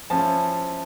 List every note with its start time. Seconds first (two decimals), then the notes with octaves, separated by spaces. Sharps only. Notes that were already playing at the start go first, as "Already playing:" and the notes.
0.10 F3 C#4 E4 A5